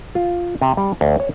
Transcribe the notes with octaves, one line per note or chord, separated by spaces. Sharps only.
F4
C3
G3
D2
C#5